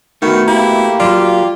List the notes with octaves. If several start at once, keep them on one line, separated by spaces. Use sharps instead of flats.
D#3 A3 B3 F#4
A#3 E4 G4
F#3 F4 D5